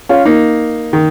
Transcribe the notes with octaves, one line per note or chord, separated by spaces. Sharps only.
C#4 F4
A#3 D#4
D#3